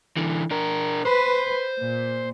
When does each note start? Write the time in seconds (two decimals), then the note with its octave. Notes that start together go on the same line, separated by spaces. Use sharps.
0.17 D3 E3
0.51 D4 A#4
1.05 B4 C5
1.80 A#2